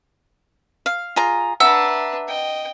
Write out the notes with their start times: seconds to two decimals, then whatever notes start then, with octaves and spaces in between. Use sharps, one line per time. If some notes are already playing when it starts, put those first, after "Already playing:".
0.86 F5
1.16 F4 G#4 A#5
1.60 D4 B4 E5 F#5 A#5 E6
2.28 D#5 G5